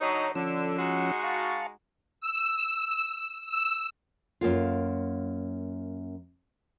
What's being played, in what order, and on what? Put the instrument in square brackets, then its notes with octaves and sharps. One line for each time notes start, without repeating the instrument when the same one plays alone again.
[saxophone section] D3 F#3 D#4 [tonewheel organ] C#5
[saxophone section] D3 [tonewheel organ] F3 C#4 E6
[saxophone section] G#3 D#4 F#4
[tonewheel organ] F5 A5 C#6
[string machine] E6
E6
[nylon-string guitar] F#2 A#3 F4